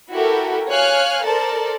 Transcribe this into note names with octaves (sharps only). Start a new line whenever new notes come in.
E4 F#4 G4 A4 A#4
C#5 F5 G#5 F6 F#6
A4 A#4 C5 D5 A5